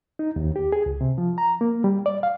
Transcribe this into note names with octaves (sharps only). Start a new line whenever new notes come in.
D#4
D#2
G4
G#4
C#2
C3
F3
A#5
A#3
G3
D5
F5